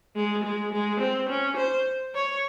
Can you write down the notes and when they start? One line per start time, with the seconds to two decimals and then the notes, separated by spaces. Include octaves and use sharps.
0.15 G#3
0.44 G#3
0.72 G#3
1.00 C4
1.29 C#4
1.57 C5
2.14 C#5